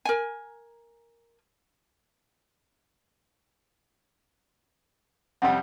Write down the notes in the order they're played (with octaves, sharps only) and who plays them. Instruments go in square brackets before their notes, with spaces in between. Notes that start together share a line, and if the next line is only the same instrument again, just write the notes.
[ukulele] A#4 G#5
[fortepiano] F2 C3 G3 [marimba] F#5